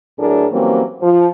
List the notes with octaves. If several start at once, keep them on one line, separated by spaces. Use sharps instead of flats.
A2 F#3 A3 D4 G#4 A#4
E3 F#3 G3 A#3 C4 C#4
F3